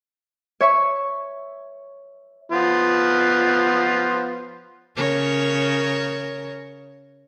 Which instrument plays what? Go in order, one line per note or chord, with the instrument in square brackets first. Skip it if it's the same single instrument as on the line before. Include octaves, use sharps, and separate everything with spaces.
[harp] C#5 E5 C#6
[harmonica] F3 B3 F4
[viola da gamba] C#3 A#4 C#5